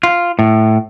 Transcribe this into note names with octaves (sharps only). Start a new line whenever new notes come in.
F4
A2